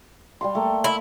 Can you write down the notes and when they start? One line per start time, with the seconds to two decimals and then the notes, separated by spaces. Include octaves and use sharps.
0.41 G3 F5 C6
0.55 A3 A#3
0.84 E4